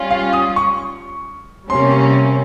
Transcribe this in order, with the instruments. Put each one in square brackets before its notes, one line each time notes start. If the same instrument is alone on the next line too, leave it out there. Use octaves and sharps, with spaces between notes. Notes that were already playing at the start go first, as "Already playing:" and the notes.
Already playing: [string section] G3 C#4 F4
[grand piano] F5
D#6
C#6
[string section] C3 G3 A#3 C#4 [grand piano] C6